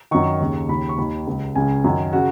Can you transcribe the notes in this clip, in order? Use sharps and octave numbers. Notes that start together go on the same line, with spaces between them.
F#2 D#3 C#6
D#2 C#3
D#2 C#3 B5
C#6
D#2 D#3 B5
C#2 C#3
C#2 C#3 G#5
F#2 D#3
C#3 F#4